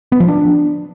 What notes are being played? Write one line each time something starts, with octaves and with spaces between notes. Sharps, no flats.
B3
F3
D4